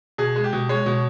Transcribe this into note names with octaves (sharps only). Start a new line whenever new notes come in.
B2 G#4
G#3
G4
B2
G#3 C#5
B2